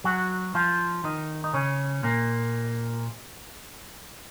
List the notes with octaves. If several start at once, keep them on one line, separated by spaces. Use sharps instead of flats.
F#3 F#4
F3 F4
D#3 D#4
D#4
C#3 C#4
A#2 A#3